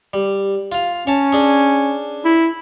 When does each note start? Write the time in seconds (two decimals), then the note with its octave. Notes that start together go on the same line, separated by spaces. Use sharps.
0.13 G3
0.72 F4 F5
1.07 C#4 C#5 A5
1.33 D4 G#4
2.25 E4